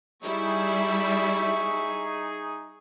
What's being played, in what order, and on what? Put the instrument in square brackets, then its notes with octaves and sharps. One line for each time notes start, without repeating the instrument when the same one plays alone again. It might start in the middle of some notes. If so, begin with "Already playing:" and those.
[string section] G3 E4 [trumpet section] D#4 G#4 [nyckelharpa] E5 C#6